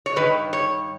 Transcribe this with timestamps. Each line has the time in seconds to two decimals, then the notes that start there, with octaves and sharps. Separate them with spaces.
0.06 C#5
0.16 G2 D#3 B4
0.53 C#5